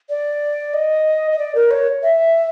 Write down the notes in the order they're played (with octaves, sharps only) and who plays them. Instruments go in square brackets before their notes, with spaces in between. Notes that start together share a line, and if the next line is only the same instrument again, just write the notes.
[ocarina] D5
D#5
D#5
D5
A#4
C#5
E5